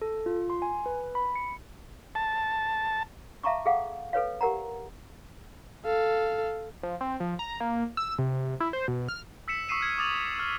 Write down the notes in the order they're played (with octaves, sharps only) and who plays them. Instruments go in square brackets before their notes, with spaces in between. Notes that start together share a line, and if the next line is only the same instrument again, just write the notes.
[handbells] A4
F4
C6
G#5
B4
B5
C#7
[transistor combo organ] A5
[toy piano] E5 F5 A5 A#5 C#6 D6
G#4 A4 F5 F#5
A4 B4 C#5 F5
G4 A#4 F#5 A#5
[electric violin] A4 F5
[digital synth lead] F3
C4
F3
A#5
A#3
E6
C3
E4
C5
B2
F6
[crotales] E6 B6 C#7 E7
C#6 D#6 E6 C7 D#7 E7
F6 G#6
D6 D#6 A6 F7 F#7
F6